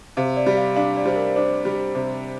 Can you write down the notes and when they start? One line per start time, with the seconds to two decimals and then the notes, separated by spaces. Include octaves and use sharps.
0.17 C3 F5
0.36 D5
0.46 G3
0.57 F5
0.76 D4 F5
0.97 D5
1.06 G3 C5
1.16 A#4
1.36 D4 C5
1.65 G3
1.95 C3